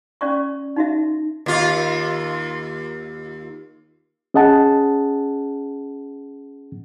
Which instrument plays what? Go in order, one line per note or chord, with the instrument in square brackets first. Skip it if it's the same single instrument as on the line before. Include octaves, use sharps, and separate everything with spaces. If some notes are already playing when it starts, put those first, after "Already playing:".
[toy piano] C#4 D5 C#6
D#4 F#4 E5
[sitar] D#2 F4
[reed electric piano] C#4 G#4 D#5 F#5 A5